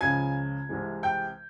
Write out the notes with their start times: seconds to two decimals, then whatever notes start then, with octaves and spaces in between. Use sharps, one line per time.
0.01 C#2 C#3 F3 G#5 G#6
0.69 C2 C3 E3 G#3
1.03 G5 G6